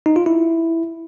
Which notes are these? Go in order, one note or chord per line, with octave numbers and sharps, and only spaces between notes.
D#4
F4
E4